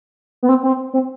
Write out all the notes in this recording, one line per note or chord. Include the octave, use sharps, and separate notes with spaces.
B3
C4
C4
C4